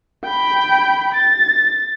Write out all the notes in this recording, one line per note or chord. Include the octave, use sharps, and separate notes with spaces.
G5 B5
A6